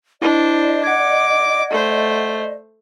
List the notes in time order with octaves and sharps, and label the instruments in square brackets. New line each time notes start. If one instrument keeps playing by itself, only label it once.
[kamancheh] D4 C5 [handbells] E4 [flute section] D5 D#5
[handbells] F#5 G#6 [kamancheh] D6
[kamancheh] A3 C5